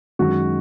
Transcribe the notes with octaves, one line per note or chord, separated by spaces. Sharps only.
F#2 D#3 G#3 F#4